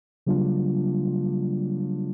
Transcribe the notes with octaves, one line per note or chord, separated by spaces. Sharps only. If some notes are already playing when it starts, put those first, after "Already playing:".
C#3 F#3 G3 A#3 D4 F4